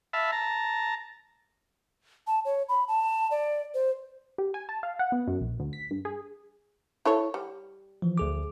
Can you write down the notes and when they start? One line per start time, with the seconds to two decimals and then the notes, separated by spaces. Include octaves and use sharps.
0.13 E5 F5 A5 B5
0.32 A5 A#5
2.27 A5
2.45 C#5
2.69 B5
2.88 A5
3.31 D5
3.74 C5
4.38 G4
4.54 G#5
4.69 A5
4.83 F5
4.99 F#5
5.12 B3
5.27 F#2
5.41 A#1
5.60 D2
5.73 B6
5.91 G2
6.05 G#4
7.05 E4 A4 C#5
7.34 G3
8.02 E3 F3
8.18 D2 G#4 D6